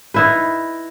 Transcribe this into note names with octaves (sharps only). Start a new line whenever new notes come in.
D#4 E4 B4